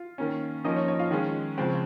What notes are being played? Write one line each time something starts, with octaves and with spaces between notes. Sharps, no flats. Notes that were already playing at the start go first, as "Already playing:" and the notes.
Already playing: F4
D#3 A#3 C#4
F3 A#3 C#4 D#4 D#5
C#5
C#5
F4 F5
D#3 G#3 C#4
C#3 F3 G#3 C4